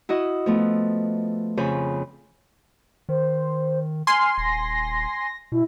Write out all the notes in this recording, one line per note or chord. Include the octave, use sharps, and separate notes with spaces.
E4 F#4 D#5
F3 A3 B3
F2 C#3 F3 C5 G#5 B5
D#3 C5
G#5 C6 F6
D#1 A#6
B2 E4